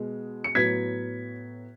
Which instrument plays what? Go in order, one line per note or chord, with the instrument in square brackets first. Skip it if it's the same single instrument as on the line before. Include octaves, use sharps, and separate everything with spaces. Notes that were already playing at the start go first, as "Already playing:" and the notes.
Already playing: [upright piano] B2 G#3
C#7
A2 F#3 B3 G#6 B6